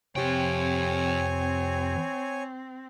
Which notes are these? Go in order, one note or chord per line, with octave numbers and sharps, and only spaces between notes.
F2 C3 C4 G4 C#5 G5 G#5